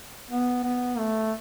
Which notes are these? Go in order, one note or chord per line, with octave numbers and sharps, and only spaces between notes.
B3
B3
A3